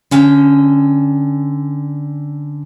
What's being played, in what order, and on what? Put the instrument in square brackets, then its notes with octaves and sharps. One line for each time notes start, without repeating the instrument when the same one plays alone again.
[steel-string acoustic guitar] D3 C#4 G5